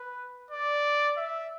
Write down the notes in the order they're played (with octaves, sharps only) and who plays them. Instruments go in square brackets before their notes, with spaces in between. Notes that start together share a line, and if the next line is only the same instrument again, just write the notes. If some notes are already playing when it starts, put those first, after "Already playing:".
Already playing: [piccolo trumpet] B4
D5
E5